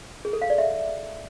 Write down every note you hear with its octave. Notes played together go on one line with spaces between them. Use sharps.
G#4
A4
F5
D5
E5